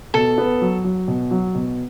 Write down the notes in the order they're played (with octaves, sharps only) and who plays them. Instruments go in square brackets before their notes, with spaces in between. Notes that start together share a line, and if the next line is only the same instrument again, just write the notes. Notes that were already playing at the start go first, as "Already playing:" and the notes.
[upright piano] B2 [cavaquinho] A4
[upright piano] B3
F#3
F#3
B2
F#3
B2